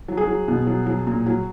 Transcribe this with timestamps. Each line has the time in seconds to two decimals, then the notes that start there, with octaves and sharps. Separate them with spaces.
0.08 F#3
0.17 G#4
0.27 F#3
0.48 B2
0.67 F#3
0.86 F#3
1.07 A#2
1.26 F#3